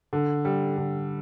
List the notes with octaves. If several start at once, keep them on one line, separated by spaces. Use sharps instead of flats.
D3
G3
D3